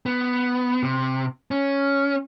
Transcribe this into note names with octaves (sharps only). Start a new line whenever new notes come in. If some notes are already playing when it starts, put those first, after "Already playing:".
B3
C3
C#4